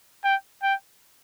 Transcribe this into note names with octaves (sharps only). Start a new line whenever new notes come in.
G5
G5